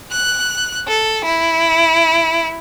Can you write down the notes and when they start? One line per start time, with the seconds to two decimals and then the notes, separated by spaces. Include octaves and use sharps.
0.11 F#6
0.88 A4
1.25 E4